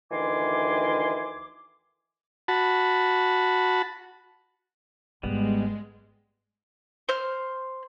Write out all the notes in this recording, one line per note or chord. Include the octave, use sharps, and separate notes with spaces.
D2 D#3 E3 G#5 C6 D6
F#4 A5 B5
G#1 G3 G#3 B3
C5 F6